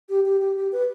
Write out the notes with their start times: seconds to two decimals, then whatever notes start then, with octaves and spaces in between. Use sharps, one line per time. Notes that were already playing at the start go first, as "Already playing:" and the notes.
0.09 G4
0.26 G4
0.41 G4
0.57 G4
0.72 B4